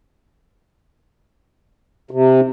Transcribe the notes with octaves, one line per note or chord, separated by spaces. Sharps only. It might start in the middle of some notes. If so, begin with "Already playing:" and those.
C3